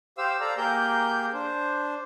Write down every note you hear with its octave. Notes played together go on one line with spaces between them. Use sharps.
G4 C5 F5 E6
A4 D5 F5 A#5
A#3 G4 G#4 A#4 G6
D4 C5